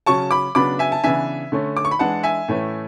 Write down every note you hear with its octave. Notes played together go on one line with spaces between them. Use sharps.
C#3 F#3 C#4 A5 C#6
B5 D6
C#3 F#3 B3 D4 B5 D6
E5 G#5
A5
C#3 E3 B3 D4 E5 G#5
D3 A3 C#4
D6
C#6
B5
E3 G#3 D4 F#5 A5
E5 G#5
A2 E3 A3 C#4